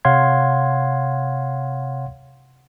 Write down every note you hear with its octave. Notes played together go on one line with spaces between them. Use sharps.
C3 C#5 F5 F#5 C6 G#6